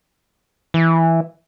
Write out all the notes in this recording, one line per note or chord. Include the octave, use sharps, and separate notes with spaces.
E3